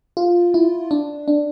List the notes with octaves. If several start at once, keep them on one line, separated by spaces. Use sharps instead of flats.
F4
E4
D4
D4